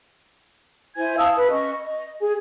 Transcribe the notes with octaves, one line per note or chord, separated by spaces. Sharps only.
E4 C5 G#5 G#6
F5 A5 D#6 E6
B4
C#4 D#5 C#6
D#5
G#4 G#5